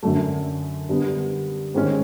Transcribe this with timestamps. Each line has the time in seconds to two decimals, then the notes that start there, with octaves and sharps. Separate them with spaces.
0.03 F#2 D3 F#3 A3
0.89 D3 G3 B3
1.74 G#2 D#3 G#3 C#4